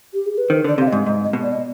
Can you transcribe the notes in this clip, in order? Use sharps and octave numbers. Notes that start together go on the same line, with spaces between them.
G4
G#4
B4
D#3 C5
D3 D5
C3 F5
D#5
G#2
G#2 D#5
D#5
B2
D5
D#5